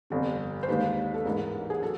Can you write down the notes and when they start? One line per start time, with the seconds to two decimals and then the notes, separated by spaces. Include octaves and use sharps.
0.10 G1 F2 C3
0.63 C5
0.68 D#2 D#3 G#3 B4
1.14 A4
1.25 A1 G#2 E3 G#3 A#4
1.70 G#4
1.82 F#3 A4